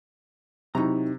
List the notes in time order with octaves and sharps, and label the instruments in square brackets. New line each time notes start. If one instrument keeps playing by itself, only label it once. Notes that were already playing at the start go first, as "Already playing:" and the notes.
[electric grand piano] C3 [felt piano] F#3 E4 C#6 [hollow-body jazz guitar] D#4 A#5